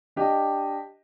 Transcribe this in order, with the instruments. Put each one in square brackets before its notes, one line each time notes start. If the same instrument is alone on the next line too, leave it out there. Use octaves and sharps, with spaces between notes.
[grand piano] D4 G4 D#5